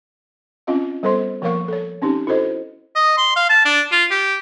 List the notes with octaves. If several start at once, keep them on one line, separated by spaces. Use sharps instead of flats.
C4 C#4 F4 D#5 F5
G3 B3 A4 C5 D#5 C6
F3 A#3 A#4 C#5 F5 C#6
A4 C#5
C4 C#4 D#4 G4
E4 F#4 A4 C5 D#5
D#5
C6
F5
A5
D4
F4
G4